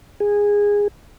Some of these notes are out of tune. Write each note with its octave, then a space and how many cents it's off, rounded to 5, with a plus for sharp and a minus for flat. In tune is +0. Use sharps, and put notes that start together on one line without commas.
G#4 -15